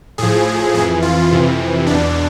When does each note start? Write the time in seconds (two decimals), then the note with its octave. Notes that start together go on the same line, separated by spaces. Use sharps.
0.18 A2 F3 G#4
0.74 F2 E3 G#4
1.02 F4
1.31 F2 C3 E3
1.87 E2 B2 D4